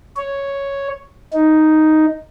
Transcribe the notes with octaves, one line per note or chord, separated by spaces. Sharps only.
C#5
D#4